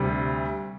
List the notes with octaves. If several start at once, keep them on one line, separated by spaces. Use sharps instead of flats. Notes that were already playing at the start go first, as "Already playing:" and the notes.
Already playing: D2 C3 G3